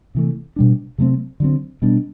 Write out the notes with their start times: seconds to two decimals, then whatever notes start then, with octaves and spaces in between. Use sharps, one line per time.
0.15 C3 E3 A3
0.56 B2 G3 D4
0.98 C3 F#3 A3 C4
1.40 D3 F#3 C4
1.82 B2 G3 B3 D4